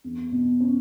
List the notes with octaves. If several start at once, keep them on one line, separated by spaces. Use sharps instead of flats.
E2
B2
C#4